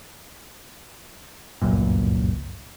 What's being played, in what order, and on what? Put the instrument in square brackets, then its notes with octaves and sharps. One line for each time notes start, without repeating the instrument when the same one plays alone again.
[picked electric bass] G1 C#2 F#2 A#2